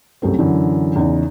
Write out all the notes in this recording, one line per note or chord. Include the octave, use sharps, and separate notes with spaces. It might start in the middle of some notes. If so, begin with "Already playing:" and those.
C2 F#2 A3 C4
F#2 D3 E3
E2 C#3 D#4